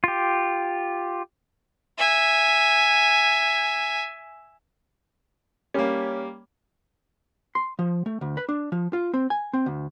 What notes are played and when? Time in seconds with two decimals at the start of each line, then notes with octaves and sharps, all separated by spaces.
0.04 F4 G4
1.97 E5 G#5
5.74 G3 A#3 C#4
7.55 C6
7.79 F3
8.06 A3
8.21 D2
8.37 B4
8.49 D4
8.72 F3
8.93 F4
9.13 C4
9.30 G#5
9.53 C4
9.66 D2